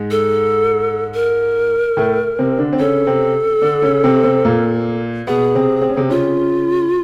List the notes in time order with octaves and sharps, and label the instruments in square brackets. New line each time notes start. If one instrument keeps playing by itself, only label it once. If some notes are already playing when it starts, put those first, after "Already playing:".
Already playing: [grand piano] G#2 G#3
[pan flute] A4
A#4
[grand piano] A2 A3
C3 C4
D3 D4
C4
[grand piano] C#3 C#4 [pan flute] A4
[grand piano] C3 C4
D3 D4
C#3 C#4
C3 C4
C3 C4
A#2 A#3
[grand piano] B2 B3 [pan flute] G#4
[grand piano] C3 C4
C4
C#4
C3 C4
[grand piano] C#3 C#4 [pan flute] F4